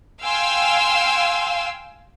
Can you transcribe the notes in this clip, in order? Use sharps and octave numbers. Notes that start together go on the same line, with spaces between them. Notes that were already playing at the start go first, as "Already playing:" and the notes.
F5 G5 G#5 C6 E6